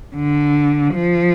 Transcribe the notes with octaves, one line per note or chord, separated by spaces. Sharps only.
D3
F3